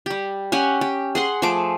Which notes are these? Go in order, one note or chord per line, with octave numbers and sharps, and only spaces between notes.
G3 G4
C#4 G4 F#5 G#5
G4
G#4 F#5 C6
F3 A3 G#4 D6